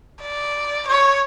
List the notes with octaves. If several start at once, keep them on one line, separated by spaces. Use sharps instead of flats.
D5
C#5